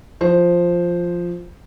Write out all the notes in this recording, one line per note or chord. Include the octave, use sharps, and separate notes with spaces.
F3 C5